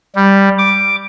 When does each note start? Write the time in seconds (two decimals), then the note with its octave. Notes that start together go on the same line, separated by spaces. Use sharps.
0.16 G3
0.58 D6